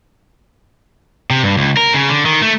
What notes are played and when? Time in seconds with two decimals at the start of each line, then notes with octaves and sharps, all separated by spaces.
1.30 C3
1.43 G2
1.57 C#2
1.77 A#4
1.94 C#3
2.09 D3
2.26 D#3
2.42 A3